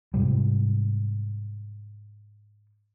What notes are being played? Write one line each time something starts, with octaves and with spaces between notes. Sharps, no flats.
G#2 C3 G3